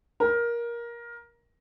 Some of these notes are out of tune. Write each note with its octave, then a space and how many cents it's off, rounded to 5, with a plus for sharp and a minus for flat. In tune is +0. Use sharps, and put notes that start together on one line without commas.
A#4 +15